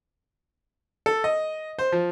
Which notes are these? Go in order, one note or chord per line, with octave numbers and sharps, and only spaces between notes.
A4
D#5
C5
F3